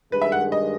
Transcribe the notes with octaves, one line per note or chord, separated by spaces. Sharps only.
G2 D#3 G#3 B4
E5
F#5
D#5